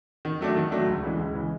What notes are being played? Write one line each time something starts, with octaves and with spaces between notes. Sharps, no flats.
D#3
F#3 A3 D4
D#3
F#3 A3 D4
C#2
C#3 E3 G#3
C#2
C#3 E3 G#3